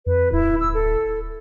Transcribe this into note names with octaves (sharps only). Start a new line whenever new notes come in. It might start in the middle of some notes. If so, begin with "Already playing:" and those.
F2 B4
D1 E4
E6
A4